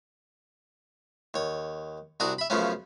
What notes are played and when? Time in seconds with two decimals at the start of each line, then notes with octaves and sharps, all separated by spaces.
1.34 D#2 C#5
2.20 C2 D4 F#4 A#5 D#6
2.38 E5 B5
2.50 F#2 C#3 F3 A3 B3 C#4